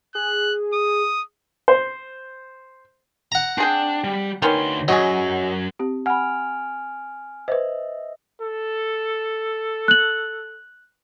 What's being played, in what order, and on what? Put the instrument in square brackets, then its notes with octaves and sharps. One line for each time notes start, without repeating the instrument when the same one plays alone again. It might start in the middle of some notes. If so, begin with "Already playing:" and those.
[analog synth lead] G#4 [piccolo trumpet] F#6
[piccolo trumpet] D#6
[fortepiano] C5
[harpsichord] F#5 A#5
[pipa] C4 G#4 G5 [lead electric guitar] D4
[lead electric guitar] G3
[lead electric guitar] D2 C6 [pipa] D#3 B3 C#4
[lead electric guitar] F#2 [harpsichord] F#3 [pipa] G#4 D#5
[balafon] C4 G4
[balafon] F#5 B5 [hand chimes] G#5 F6
[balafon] B4 C5 [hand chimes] D#5 E5
[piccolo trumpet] A4
[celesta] F#6 F#7